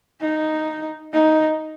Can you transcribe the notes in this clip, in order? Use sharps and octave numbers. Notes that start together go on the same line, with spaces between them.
D#4
D#4